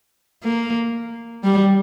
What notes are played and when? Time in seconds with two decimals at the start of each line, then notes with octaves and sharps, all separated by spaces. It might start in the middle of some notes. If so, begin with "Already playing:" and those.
0.44 A#3
1.44 G3